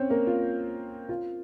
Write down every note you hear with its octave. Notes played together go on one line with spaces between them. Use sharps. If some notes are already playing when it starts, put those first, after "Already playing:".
Already playing: C4 C#4 C5 C#5
A#3 A#4
F4
F4